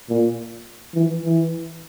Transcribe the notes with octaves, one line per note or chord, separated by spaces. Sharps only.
A#2
E3
E3